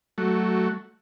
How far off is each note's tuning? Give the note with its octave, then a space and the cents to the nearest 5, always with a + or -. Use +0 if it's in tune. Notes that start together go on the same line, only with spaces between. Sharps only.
F#3 +15 A3 +0 F#4 +0